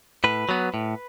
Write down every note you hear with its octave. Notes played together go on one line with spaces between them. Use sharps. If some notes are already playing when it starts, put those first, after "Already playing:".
A2 B4
F#3 B3
A2